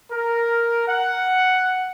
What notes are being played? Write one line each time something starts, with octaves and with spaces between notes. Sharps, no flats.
A#4
F#5